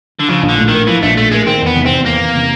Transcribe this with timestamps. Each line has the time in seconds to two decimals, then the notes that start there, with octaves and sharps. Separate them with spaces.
0.19 D3
0.28 C#3 F3
0.43 A#1
0.49 D3
0.57 A2
0.68 D#3 A#3
0.87 E3 F3
1.03 A#1 A3
1.17 A2 A3
1.31 G#3 A#3
1.46 D#3 C4
1.62 E2 B3
1.76 C3
1.86 C4
1.91 E2
2.06 D#3 A#3
2.21 E2
2.36 C3